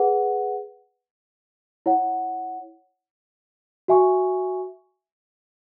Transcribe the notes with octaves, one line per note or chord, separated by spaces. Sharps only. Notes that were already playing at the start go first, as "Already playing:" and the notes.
Already playing: G#4 B4 F#5
E4 C#5 F#5
F#4 E5 G#5 C#6